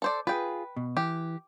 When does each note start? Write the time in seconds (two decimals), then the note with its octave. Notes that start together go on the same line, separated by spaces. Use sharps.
0.02 A4 C5 D5
0.27 F4 G#4 B4 G5
0.76 B2
0.97 E3 G4